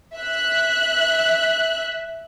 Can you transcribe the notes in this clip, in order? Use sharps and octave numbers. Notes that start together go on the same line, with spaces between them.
E5 F#6